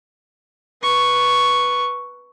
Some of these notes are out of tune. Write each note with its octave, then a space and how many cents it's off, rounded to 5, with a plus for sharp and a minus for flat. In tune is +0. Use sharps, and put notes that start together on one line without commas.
B4 -10 C#6 +0